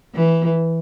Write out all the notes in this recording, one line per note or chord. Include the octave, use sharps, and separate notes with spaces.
E3